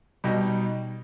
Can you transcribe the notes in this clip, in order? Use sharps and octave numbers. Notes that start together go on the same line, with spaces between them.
B2 G3 D#4